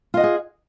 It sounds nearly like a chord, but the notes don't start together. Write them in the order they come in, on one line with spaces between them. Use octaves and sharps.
F4 D#5 F#5 G#4